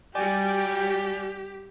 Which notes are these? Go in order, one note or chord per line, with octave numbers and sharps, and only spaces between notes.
G3 F#4 G4 D5 G5 G#5 D6